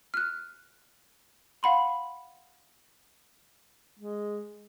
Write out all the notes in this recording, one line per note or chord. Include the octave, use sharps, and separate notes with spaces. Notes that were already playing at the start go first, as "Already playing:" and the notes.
F6 F#6
F5 F#5 B5 C6
G#3